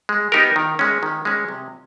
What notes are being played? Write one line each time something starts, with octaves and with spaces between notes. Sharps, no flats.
G#3
B3 D#4 G4 A#4
D#3
G#3 C#4
D#3
G#3 C#4
C3